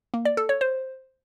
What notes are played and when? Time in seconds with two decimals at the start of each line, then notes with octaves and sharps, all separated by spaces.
0.14 A#3
0.25 D5
0.37 A4
0.49 C#5
0.61 C5